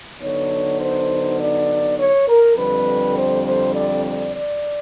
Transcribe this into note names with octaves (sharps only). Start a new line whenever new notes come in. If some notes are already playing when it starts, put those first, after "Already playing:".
D3 F#3 B3 D#4 C#5
C5
D5
C#5
A#4
F2 D3 G3 C4 B4
C5
C5
D5
D5
D5